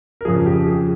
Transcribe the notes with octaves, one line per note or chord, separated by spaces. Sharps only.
A#4
F2 C#3 F3 G#4
G4
G#4